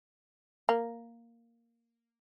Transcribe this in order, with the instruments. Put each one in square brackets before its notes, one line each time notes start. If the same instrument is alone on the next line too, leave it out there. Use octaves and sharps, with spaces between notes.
[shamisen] A#3